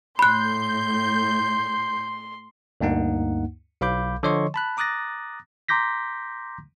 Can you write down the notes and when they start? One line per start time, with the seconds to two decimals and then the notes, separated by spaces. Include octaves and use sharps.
0.19 A2 B5 C6 F#6 G6
2.81 D2 G2 A#3 D#4 F#5
3.81 B1 F5 B5 D6 G6
4.23 D3 F3 C#5 D#5 C6 C#6
4.54 A5 B5 F#6
4.77 A#5 D6 D#6 F#6 A6 A#6
5.69 A#5 C6 D6 G6 A#6 B6